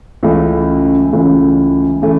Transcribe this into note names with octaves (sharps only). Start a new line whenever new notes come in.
C#2 C#3 E3 A3
C#2 C#3 E3 A3
C#3 E3 A3